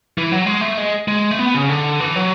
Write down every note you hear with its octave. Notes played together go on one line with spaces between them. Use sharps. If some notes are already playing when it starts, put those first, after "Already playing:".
E3
F#3
G#3
A3
G#3
G#3
A3
B3
C#3
D3
E3
F#3